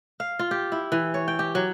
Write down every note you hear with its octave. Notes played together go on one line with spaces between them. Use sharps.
F5
F4
G4
E4
E3
C#5
G5
G4
F#3